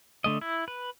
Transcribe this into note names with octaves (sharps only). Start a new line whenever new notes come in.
D3 A3 D#5
E4
B4